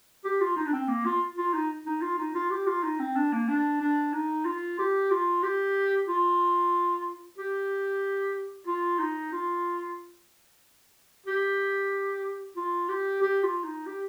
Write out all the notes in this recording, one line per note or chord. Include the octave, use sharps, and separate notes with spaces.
G4
F4
D#4
D4
C4
A#3
F4
F4
D#4
D#4
F4
D#4
F4
G4
F4
D#4
C4
D4
A#3
D4
D4
D#4
F4
G4
F4
G4
F4
G4
F4
D#4
F4
G4
F4
G4
G4
F4
D#4
G4